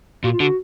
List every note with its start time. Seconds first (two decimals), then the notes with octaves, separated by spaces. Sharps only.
0.24 A#2 F#4
0.32 F4
0.40 D3 F#4